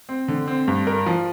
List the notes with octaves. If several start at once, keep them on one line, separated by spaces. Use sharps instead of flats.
C4
D3
C4
G2
A#4
F3